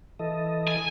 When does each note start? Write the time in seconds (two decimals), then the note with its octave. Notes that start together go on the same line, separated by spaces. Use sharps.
0.20 E3 A4 D#5
0.68 G#5